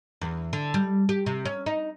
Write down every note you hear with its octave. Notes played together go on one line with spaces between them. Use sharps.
E2
D3
G3
G4
C3
C#4
D#4